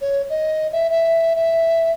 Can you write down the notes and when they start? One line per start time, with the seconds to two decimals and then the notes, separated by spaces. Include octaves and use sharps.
0.01 C#5
0.30 D#5
0.72 E5
0.90 E5
1.36 E5